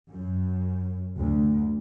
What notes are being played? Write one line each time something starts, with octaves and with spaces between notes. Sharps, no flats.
F#2
D2